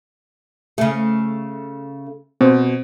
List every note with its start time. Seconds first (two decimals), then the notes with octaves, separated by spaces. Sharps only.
0.78 C#3 A3 G#4
2.41 B2 C4 C5